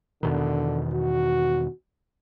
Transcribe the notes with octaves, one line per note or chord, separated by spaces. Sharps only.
E2 B2 D3 D#3
F#4